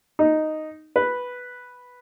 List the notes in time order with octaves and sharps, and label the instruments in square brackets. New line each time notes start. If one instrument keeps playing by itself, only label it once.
[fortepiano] D#4
B4